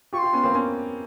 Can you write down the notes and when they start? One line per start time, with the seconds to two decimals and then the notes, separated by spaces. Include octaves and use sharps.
0.13 F4 G4 C#6
0.17 C6
0.23 F4 G4
0.33 B3 C#4
0.43 A#3 C4
0.54 B3 C#4